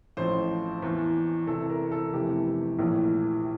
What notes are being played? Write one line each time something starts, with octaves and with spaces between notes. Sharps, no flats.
A1 A2 F3 C5
E2 E3
C2 C3 E3 A4
A#4
A4
F1 E2 C3 E3 G4
A#1 A2 E3